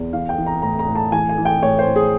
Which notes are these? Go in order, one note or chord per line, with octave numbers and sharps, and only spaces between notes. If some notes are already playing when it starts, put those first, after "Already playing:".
Already playing: E2
E3 F5
G5
E3
A#5
A2 A#5
A#5
A2
A5
E3 G#5
G#5
E3
G5
A2 C#5
C5
A2
G#4